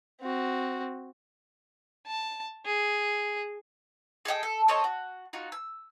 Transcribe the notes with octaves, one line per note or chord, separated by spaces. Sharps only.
C4 F#4
A5
G#4
G#4 A4 D#5 G5
A4
C4 A4 C#5 D#5
F#4
D#4 F4 F#4
E6